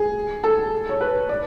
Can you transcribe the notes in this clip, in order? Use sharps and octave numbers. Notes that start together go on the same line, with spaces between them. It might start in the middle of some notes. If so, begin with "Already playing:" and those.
Already playing: G#4
A4
C#5
B4
D5